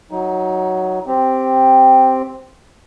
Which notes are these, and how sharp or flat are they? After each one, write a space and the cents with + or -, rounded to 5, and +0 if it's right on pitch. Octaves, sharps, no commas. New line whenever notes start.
F#3 +5 D#4 +20
C4 +0 G4 +0